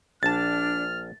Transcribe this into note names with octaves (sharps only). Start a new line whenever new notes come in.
A#1 D4 A5 F6 A6